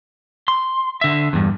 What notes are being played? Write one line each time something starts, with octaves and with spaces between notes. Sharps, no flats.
C6
D3 E5
E2 G2